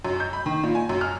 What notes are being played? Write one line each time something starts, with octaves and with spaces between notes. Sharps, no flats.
F#2
G6
B5
D#3
A#2
G#5
F#2
F6